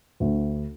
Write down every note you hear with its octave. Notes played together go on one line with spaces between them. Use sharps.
D2